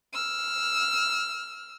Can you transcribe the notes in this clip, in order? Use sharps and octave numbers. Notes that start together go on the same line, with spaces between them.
E6 F6